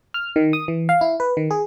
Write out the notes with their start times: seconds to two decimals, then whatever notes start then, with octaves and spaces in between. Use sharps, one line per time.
0.14 F6
0.36 D#3
0.53 D#6
0.68 E3
0.89 F5
1.01 E4
1.20 B4
1.37 D#3
1.51 G#4